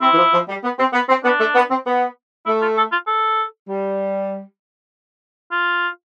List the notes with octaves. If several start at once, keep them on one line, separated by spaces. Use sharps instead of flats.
C4 E4
E3
F3
F3
G3
B3
C4
B3
C4
B3 D4
A3
B3
C4
B3
A3 E4
F4
A4
F4
A4
G3
F4